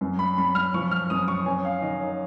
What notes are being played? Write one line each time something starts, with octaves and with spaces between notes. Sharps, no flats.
F#2
B5
F#2 B5
F6
F3 C#6
F6
F#2 D#6
C#6
C#4 G#5
F5
D#3 D#5
C#5